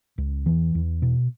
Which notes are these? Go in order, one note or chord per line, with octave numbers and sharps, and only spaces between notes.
C#2
E2 E3
E2
B2